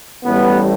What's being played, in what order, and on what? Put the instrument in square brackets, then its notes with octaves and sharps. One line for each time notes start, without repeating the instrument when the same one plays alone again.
[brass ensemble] A1 A2 G3 B3